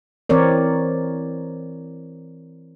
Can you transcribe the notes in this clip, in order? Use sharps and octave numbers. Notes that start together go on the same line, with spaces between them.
E3 C4 A#4 C#5 D5